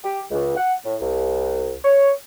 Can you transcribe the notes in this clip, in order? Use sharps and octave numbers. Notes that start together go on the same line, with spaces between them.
G4
C#2
F#5
A2
C2
C#5